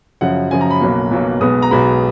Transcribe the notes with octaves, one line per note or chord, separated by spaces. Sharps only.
F#2 C#3 F3 F#5
F#2 C#3 F3 G#5
A#5
B5
B1 B2 F#3 A#3
B1 B2 F#3 A#3
B1 B2 G#3 B3 D#6
A#5
B1 B2 G#3 B3 B5